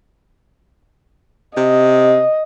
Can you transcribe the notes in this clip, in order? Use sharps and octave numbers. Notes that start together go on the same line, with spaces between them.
C3 D#5